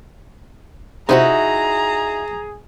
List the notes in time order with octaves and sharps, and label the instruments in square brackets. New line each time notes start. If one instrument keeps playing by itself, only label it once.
[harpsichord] C3 G3 C4 [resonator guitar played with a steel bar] D#4 E4 F#4 [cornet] G#4 [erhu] A#5